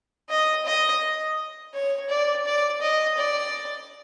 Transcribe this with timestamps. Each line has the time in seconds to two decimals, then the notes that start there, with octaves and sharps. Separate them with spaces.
0.29 D#5
0.65 D#5
1.73 C#5
2.09 D5
2.45 D5
2.81 D#5
3.17 D5